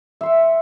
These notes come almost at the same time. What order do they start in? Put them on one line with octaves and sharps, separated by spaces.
E5 C6 F#5